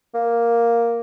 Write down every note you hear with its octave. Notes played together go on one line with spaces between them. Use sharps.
A#3